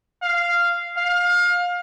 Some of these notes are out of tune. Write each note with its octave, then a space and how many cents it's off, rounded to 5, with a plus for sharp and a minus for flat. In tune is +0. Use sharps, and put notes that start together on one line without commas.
F5 -10
F5 +25